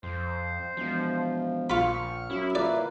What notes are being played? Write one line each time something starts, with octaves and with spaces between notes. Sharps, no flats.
F2 C5
E1 F3
A#1 F4 B5 C#6 F6
F#2 E4
A#2 A#3 B4 D5